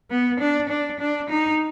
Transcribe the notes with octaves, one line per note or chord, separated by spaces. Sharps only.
B3
D4
D4
D4
D#4